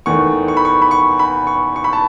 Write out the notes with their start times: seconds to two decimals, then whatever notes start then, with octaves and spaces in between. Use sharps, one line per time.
0.06 E2 D#3 A3 C#6
0.48 C#6
0.57 B5
0.65 C#6
0.82 B5
0.91 C#6
1.19 B5
1.47 C#6
1.76 C#6
1.84 B5
1.93 A5